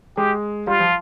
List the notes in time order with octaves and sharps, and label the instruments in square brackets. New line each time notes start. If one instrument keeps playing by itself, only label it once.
[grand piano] G#3 [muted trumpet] G4
[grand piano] G3 [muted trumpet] F4
[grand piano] F3